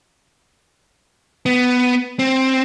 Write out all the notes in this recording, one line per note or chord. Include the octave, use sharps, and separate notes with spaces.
B3
C4